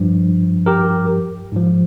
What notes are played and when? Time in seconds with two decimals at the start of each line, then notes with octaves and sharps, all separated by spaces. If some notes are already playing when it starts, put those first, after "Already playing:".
Already playing: G2 F3
0.66 G4 A#4
1.52 G#2 F3